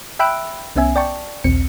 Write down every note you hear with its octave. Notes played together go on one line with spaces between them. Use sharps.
E5 G5 B5 E6 F#6 D7
C2 B3 C#4 E5 G#5
D5 G5 A5 C#6
A#1 D#2 C4 C#7